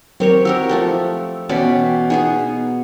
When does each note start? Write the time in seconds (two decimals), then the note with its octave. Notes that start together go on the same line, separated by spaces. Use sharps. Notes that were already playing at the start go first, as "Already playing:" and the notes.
0.20 F#3 C4 G4 A#4 C#5
0.45 F#4 G4 A#4 E6
0.69 F3 A3 G4
1.49 B2 E3 C#4 D5 G5 B6
2.10 B3 D#4 F#4 G#4